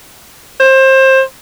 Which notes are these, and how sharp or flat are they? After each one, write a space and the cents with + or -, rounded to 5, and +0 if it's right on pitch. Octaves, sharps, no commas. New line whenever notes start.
C5 +25